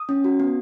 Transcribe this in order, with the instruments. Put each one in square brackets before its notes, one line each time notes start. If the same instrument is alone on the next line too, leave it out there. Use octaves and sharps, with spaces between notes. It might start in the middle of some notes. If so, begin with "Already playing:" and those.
Already playing: [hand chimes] D#6
C#4
F#4
B3